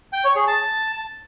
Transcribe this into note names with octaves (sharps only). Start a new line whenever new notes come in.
G5
C#5
G#4
A5